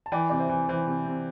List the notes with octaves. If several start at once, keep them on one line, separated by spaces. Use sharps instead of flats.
A5
E3 D5 G5
C3 D5
C5 E5
E3
E3 C5
C3
C3